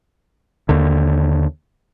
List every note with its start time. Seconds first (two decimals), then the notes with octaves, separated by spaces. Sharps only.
0.69 D#2 D3